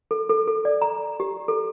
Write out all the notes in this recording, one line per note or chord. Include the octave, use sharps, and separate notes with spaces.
A4
A4
A4
D5
A#5
G4
A4